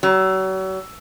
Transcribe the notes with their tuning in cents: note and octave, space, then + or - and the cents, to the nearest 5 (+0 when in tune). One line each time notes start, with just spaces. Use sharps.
F#3 +40